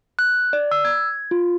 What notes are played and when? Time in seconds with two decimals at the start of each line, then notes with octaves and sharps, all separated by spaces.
0.19 F#6
0.53 D5
0.71 E6
0.85 G#6
1.31 F4